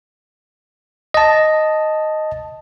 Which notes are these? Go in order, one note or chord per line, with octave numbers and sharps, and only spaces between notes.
D#5 A5